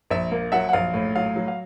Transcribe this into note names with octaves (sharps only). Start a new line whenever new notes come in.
A#1 E5
A#3
F#3 E5 F#5
F#5
A#1 F5
A2
F#3 F5
F#3
F5